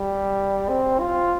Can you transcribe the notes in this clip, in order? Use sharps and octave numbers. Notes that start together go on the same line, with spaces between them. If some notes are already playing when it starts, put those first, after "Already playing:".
Already playing: G3
C4
F4